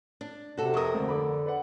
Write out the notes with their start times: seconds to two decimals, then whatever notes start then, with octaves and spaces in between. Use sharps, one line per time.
0.21 D4
0.57 C3 F#4 A4
0.74 F2 A#4 C#6 D#6
0.94 D2 D3 C4
1.08 D3 B5 D6
1.46 B4 D5 F#5